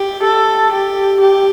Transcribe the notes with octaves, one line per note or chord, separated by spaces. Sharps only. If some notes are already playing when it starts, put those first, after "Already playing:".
Already playing: G4
A4
G4
G4